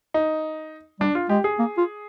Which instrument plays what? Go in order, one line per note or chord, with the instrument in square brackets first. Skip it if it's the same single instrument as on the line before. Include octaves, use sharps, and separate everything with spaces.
[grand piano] D#4
[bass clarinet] G3 [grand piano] D4
[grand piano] F4
[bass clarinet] G#3 [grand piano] G4
[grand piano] G#4
[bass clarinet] A#3
F4